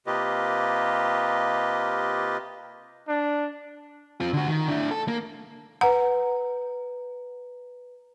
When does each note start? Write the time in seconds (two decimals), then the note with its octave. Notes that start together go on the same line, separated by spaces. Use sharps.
0.07 C3 A#3 F4 G4 B4 D#5
3.08 D4
4.20 C4 F4
4.33 D3 F#4
4.48 D#3
4.68 D4 E4
4.91 A4
5.08 A#3
5.81 B4 F#5 A#5